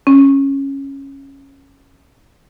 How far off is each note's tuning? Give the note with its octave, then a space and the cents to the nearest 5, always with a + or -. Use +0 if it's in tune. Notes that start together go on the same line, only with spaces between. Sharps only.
C#4 -10